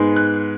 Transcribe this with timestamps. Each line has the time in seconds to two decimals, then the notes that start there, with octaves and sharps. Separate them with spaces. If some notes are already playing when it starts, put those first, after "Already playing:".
Already playing: G#2 G#3 B3
0.16 F#6